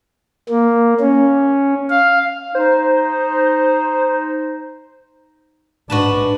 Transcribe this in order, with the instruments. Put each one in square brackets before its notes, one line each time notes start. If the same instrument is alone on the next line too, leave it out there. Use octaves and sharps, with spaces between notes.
[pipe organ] A#3
C#4
F5
[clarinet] D#4 [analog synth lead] C5
[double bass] G#2 D4 [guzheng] F#4 B4 A5